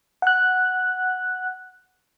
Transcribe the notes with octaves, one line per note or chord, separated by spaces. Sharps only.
F#5 F#6